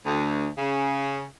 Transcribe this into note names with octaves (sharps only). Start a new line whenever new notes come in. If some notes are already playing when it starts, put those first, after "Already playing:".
D2
C#3